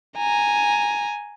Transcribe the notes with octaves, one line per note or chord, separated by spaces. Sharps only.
G#5 A#5